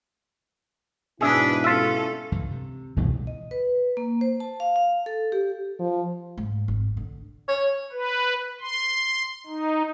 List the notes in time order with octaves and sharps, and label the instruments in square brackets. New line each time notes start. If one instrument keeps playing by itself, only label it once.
[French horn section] G#2 B2 E4 [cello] D4 B4 [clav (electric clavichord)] G#4 E5
[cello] C#4 A4 [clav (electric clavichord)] F4 E5
[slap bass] C#2 G2 E3
C3
[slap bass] E1 G2 [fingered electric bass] C#2 B2 E3
[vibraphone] D#5
B4
A#3
C5
A5
F5
F5
A4
G4
[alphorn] F3
[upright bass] G#2
G#1
D3
[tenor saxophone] C#5
[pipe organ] B4
C6
D#4